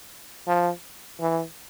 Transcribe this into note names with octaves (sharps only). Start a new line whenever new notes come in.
F3
E3